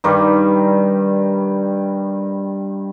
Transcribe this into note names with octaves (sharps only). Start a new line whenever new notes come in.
G2 D#3 G3